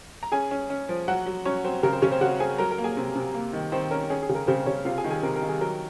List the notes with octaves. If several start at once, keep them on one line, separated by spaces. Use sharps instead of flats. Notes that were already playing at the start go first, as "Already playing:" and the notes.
A#5
C#4 G#4 G#5
C#4
C#4
F3
F#3 F#4 F#5
F#3
F#3 C#4 C#5
F#3 C4 C5
C#3 A#4
C4 C5
C#3 C#4 C#5
C4 C5
C#3 F#4 F#5
C4 G#4 G#5
F#3 A#4 A#5
A#4 A#5
A#3
G#4 G#5
C3
C3
A#3
D#3
D#3 C4 C5
C#4 A#4
C#4 G#4
G#4
C#3
A#4
C#3 C4 C5
C#3 C#4 C#5
C3 F4 F5
G#4 G#5
D#3
G#4 G#5
C3 A#4
A#4
D#3
G#4
F#3 A#4